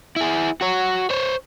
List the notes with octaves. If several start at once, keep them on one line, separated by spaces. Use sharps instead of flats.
E4 G#4
F#4 C#5
C5 C#5